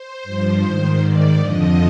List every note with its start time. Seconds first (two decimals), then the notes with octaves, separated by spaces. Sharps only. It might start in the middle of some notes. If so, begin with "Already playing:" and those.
Already playing: C5
0.24 G2 F3
0.62 G#2 D#3
1.00 G#2 D#3 D5
1.38 F2 D3 F3 D#5